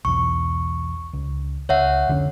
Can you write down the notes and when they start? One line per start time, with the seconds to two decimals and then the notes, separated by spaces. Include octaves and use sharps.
0.05 B1 E2 C#6
1.13 C#2
1.69 C#2 C#5 E5 F#5
2.07 F1 D3 C#4